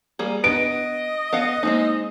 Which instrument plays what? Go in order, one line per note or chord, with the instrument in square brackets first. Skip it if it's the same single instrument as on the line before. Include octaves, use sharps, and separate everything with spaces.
[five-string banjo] G3 A#3 G#4
[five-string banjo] B3 [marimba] D4 B4 [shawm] D#5 [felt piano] D7
[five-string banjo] B3 F5 F#5
[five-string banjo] G#3 C4 D#4 [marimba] A#3